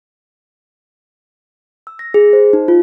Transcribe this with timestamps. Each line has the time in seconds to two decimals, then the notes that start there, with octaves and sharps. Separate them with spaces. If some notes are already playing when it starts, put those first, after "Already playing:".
1.87 E6
1.99 A#6
2.14 G#4
2.33 C5
2.53 D#4
2.68 F4